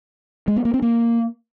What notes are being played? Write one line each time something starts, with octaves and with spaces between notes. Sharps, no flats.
G#3
B3
A#3
C4
A#3